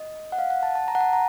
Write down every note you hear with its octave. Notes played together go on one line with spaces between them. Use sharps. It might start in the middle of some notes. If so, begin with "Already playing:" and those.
Already playing: D#5
F#5
F5
F#5
A5
A5
A#5
F#5
A5
A#5